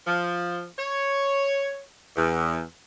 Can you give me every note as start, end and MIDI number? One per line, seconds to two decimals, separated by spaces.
0.07 0.64 53
0.79 1.82 73
2.16 2.61 40